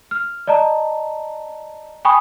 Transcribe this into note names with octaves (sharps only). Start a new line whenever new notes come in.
F6
D5 D#5 A5 A#5
G5 G#5 B5 C#6 D#6